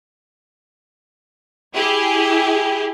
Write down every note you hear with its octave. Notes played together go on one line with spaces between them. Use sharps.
E4 G4 G#4